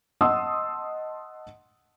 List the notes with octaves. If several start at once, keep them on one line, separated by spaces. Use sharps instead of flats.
D#5 F#5 A5 C6 D#6 E6